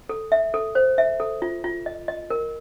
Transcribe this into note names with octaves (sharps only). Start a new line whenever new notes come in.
A4
E5
A4
C5
E5
A4
F4
F4
D#5
D#5
A#4